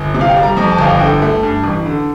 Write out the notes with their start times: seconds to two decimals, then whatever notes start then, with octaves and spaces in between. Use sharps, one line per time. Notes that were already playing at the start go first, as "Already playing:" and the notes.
Already playing: G1
0.15 C3
0.21 F5
0.29 G5
0.36 G3
0.43 A#5
0.57 F2 A#5
0.71 A5
0.78 G1 F5
0.85 G5
1.00 D3 G5
1.22 A3
1.43 G2
1.64 A1
1.86 D3